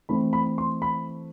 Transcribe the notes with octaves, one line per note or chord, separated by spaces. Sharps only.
E3 A3 C4 B5
B5
C6
B5